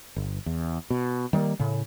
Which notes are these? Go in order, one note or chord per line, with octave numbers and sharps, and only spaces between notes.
G1
E2
B2
D#3 G3 G#3 A#3
A2 C#3